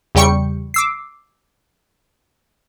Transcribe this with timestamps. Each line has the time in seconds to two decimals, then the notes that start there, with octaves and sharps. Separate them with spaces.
0.15 E2 C#3 G3 G5 C#6 C#7
0.74 D6 E6 C7